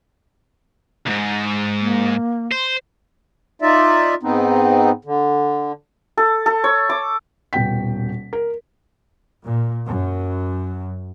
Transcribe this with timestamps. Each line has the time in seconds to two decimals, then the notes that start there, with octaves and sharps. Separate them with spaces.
1.06 D2 G#2
1.80 A#3
2.52 C5
3.62 D#4 F4 D5 E5
4.23 G#2 B3 C4 D#4
5.05 D3
6.17 A4
6.46 A4
6.64 C#5
6.89 D6
7.53 D#1 B2 G5 B6
8.33 A#4
9.43 A#2
9.87 F#2